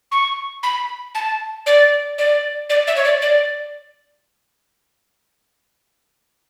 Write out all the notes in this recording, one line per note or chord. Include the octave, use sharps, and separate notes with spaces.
C#6
B5
A5
D5
D5
D5
E5
C#5
D5
D5